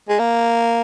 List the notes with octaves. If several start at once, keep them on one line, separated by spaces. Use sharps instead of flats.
G#3
A#3